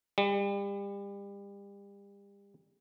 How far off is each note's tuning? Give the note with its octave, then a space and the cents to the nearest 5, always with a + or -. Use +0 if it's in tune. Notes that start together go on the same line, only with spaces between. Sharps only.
G3 +35